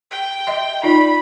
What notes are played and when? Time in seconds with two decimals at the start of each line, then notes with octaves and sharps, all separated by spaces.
0.11 G5
0.47 D#5 E5 C6
0.83 D#4 F4 D5 B5